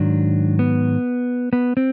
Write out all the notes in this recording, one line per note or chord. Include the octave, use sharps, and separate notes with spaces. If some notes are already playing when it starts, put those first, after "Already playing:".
Already playing: G#2 D#3 F#3 D4
B3
B3
C4